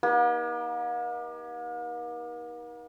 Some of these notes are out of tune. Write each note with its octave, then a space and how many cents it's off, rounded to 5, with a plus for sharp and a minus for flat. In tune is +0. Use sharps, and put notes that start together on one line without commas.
A#3 +45 D#4 +25 G4 +0